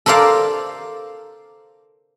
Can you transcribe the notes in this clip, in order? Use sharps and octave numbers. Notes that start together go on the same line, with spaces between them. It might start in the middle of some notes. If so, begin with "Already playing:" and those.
A4 A#4 C5 D5 F5 A5